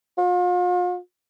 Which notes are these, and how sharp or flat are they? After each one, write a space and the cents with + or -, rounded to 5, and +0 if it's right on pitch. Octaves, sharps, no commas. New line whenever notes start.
F4 +40